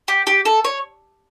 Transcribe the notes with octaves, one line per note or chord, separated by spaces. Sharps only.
G4
G4
A4
C#5